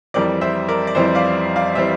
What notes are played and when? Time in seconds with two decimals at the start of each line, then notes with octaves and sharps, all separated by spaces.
0.14 F2 E3 G3 C4 A#4 D5
0.41 C5 E5
0.68 A#4 D5
0.87 D5
0.95 F2 E3 G3 C4 C5 E5
1.15 D5 F5
1.56 D5 F5
1.75 E3 G3 C4 C5 E5